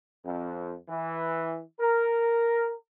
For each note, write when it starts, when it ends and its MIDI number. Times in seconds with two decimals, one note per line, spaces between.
0.24 0.76 41
0.89 1.59 52
1.80 2.73 70